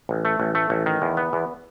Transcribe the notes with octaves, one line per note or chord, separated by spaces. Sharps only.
A1
A3
A1
A3
A1
D#3
E2
B3
E2